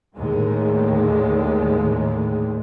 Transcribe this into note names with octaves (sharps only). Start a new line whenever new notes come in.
D#2 A2 D3 D#3 G#3